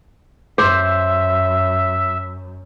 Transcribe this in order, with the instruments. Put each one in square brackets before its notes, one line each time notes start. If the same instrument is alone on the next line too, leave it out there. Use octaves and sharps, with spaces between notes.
[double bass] F#2 [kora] C5 [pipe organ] E5 [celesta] C6 D6